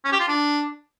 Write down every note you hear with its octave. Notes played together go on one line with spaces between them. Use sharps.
C#4
G4
F4
D4